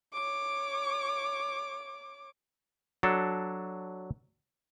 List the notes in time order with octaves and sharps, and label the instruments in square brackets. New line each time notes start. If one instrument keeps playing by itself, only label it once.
[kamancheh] C#5 D6
[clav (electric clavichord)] F#3 D4 A4